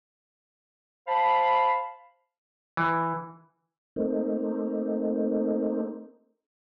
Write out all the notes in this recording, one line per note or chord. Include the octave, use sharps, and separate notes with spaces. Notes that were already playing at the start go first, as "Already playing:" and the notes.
C5 F5 A5 B5
E3
A3 A#3 C4 D#4